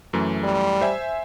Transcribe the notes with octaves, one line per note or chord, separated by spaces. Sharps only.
F#2 E3 A3
G3
C5 E5 G#5